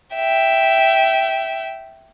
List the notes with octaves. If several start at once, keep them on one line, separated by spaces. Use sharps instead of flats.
E5 G5